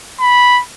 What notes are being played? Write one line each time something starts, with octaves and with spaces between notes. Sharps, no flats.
B5